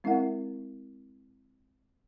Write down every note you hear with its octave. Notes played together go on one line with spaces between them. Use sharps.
G#3 C4 E4 A#4 E5 F#5